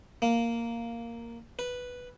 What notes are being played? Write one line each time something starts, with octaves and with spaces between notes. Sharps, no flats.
A#3
B4